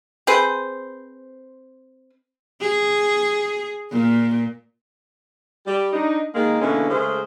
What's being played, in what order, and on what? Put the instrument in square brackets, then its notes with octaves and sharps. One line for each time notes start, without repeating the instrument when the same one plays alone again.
[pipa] C4 G#4 B4 C5
[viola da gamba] G#4
A#2
[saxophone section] G3 G4
D4 D#4
D#3 G#3 A#3
B2 D3 E3 G#3 A#3 C#4
C#3 G#3 A3 G#4 A#4 C5